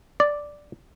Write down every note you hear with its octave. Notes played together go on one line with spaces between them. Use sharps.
D5